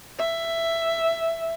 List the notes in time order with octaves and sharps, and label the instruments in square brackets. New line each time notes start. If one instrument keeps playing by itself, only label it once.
[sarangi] E5